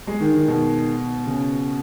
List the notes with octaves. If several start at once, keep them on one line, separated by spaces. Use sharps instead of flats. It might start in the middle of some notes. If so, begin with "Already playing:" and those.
G#3
D#3
D#3
B2
C#3